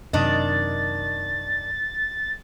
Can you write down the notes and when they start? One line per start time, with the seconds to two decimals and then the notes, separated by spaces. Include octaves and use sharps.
0.13 F#2 C3 D#3 D4 D#5 A6